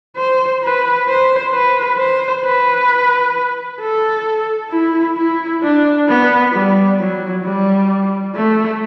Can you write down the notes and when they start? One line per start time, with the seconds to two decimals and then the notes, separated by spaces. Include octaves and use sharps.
0.17 C5
0.63 B4
1.08 C5
1.53 B4
1.99 C5
2.45 B4
3.80 A4
4.72 E4
5.17 E4
5.63 D4
6.08 B3
6.53 G3
6.99 F#3
7.44 G3
8.35 A3